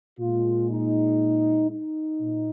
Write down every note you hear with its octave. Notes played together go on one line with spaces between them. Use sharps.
A#2 G#3 F4
D#4
D#4
A#2